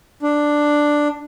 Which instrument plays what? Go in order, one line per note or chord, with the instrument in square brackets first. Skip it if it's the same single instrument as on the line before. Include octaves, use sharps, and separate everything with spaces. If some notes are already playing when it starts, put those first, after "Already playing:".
[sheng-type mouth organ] D4